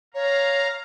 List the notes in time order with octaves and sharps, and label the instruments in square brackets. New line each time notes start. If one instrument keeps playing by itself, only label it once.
[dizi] C#5 [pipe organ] F5 A#5